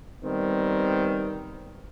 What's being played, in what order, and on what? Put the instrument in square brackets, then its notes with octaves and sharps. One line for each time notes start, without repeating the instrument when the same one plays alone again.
[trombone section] D#3 G3 B3 C4